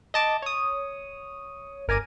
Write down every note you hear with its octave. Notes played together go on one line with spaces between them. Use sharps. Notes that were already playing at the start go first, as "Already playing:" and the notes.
D#5 A5 D6
C#5 D#6
G1 A#4 G#5 A#5 D6 D#7